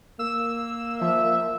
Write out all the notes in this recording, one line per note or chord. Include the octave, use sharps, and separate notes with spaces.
A#3 E6
F3 E5